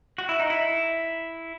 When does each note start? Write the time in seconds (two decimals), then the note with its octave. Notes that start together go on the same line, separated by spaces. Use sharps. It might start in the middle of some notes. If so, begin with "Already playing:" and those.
0.18 F#4
0.29 E4
0.40 D#4
0.50 E4